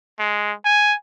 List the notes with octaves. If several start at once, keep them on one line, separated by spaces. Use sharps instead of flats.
G#3
G#5